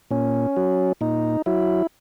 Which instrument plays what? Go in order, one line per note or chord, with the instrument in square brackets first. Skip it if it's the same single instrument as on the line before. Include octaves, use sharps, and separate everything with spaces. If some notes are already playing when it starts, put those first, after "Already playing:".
[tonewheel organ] A#2 C#4
F#3
A#2 D#4
F#3 E4